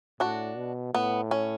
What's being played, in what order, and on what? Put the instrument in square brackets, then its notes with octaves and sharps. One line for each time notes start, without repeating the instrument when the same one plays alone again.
[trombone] A2 [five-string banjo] D4 F#4
[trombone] B2
[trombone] A2 [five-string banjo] B3
[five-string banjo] C#4